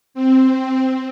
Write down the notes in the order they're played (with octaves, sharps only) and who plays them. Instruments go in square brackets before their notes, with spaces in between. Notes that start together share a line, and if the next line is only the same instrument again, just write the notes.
[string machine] C4